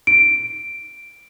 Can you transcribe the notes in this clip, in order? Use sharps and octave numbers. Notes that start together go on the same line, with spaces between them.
D7